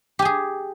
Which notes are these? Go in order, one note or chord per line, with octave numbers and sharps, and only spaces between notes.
G4 G#4 G#5